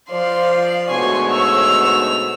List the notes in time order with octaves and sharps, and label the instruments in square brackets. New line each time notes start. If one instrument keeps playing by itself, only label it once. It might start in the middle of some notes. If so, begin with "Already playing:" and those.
[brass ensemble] F3 C5 [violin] D5 C6 [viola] F5
[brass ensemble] D2 G#2 B2 [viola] C#5 C#6 [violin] G#5 C6
[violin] E6 F7